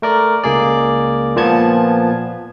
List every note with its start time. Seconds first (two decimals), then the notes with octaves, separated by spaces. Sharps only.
0.02 A3 A#4 D5
0.44 C#2 A#3 G#4 D5
1.36 A#2 F3 B3 A5 G#6